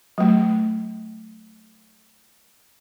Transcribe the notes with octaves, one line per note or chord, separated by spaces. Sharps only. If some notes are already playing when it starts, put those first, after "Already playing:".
F#3 A3